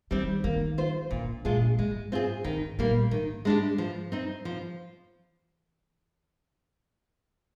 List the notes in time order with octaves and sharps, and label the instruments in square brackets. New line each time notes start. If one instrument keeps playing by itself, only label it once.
[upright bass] D#3 [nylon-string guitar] G3 C4
[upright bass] D#3 [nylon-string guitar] A#3
[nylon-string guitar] F4 C5
[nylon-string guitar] A#2 [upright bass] D3
[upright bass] A#2 [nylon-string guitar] G#3 D4 F4 G#4
[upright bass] G#2 [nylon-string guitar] G#3
[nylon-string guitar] C4 F4 G#4
[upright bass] G#2 [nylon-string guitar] D#3
[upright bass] A#2 [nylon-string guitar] G3 A#3
[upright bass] G#2 [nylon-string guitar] D#3
[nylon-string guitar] G#3 D4 G4
F3
C4 D#4
F3